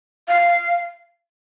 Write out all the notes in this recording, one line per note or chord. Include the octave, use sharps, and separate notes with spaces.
F5